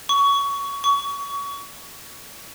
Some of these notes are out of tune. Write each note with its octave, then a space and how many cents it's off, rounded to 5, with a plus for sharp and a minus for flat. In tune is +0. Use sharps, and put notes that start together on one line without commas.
C#6 +20
C#6 +30